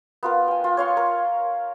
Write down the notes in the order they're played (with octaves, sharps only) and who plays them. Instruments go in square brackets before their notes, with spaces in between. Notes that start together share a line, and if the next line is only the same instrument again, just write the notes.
[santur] B3 F4 A#4
G5 G#5
F4
C#5 F5 C6 C#6
A#4